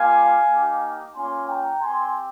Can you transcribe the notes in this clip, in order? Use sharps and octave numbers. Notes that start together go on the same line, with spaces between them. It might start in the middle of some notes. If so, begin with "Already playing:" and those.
Already playing: G3 A#3 F4 F5 G#5
A#3 D#4 G4
A#3 C#4 F4 G#5 C6
G5 A#5
C4 G4 G#5 C6